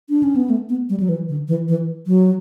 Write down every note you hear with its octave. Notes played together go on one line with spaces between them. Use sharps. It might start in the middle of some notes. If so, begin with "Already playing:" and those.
D4
C#4
B3
A3
B3
G3
F#3
E3
D3
E3
E3
F#3